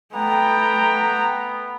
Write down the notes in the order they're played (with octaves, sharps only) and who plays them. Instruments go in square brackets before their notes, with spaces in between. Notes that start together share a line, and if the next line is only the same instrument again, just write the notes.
[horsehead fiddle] A3 A#5 [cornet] B3 [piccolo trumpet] G5